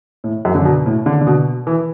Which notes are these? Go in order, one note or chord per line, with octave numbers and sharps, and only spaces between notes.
A2
F#2
D3
B2
A2
D3
D3
B2
E3